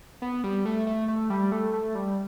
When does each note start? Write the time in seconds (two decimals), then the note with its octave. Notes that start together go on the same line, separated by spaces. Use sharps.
0.22 B3
0.44 G3
0.65 A3
0.87 A3
1.08 A3
1.30 G3
1.52 A3
1.73 A3
1.95 G3